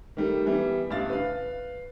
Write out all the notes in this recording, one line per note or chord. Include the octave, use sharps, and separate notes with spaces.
D#3 G3 A3
E3 G3 B3 E4
A1 G2 C#3 E4 F5 A6
B4 F5